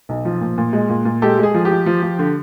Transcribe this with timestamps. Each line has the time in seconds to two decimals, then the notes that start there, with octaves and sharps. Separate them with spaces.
0.09 B1
0.25 F3
0.41 A#2
0.58 A#2
0.73 G#3
0.89 A#2
1.05 A#2
1.22 G#3 G4 A4
1.39 G#3 G#4
1.54 F3
1.65 G4
1.71 F3
1.86 F3
2.03 F3
2.19 D3